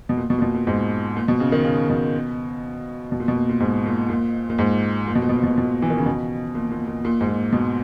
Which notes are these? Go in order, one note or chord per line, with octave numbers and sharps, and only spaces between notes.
B2
A#2
B2
A#2
B2
A#2
G#2
A#2
B2
C#3
D#3
C#3
B2
B2
A#2
B2
A#2
A#2
G#2
A#2
A#2
A#2
G#2
A#2
B2
A#2
B2
A#2
B2
A#2
B2
A#2
E3
D#3
C#3
B2
A#2
A#2
A#2
A#2
G#2
A#2
B2